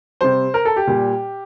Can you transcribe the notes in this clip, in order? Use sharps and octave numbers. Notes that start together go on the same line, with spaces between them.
C3 G3 C5
A#4
A4
G4
A#2 G3